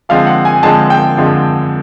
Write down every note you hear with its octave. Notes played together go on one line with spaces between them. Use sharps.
D3 F3 G#3 C4 F5
F#5
G#5
D3 F3 G#3 C4 A5
G5
D3 F3 G#3 C4